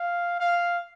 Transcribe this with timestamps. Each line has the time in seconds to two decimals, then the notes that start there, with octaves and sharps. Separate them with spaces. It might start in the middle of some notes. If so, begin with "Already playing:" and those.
Already playing: F5
0.40 F5